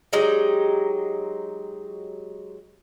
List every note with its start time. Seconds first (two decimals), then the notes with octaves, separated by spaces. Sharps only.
0.13 F#3 G#3 D#4 G4